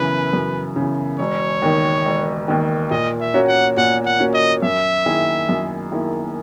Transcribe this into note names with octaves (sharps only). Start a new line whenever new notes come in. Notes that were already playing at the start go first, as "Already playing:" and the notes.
Already playing: F#2 C#3 E3 B4
F#2
C#3 E3
E1 C#5
D#2 D#3
E1
D#2 D#3
A#2 D#5
E5
A#3 C#4 F#4
F#5
A#2 F#5
F#5
A#3 C#4 F#4
D#5
F#2 E5
D#3 A#3 E4 G#4
F#2
D#3 A#3 E4 G#4